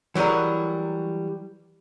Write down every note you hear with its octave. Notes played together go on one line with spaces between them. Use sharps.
E3 F#3 G3 G#4 A#4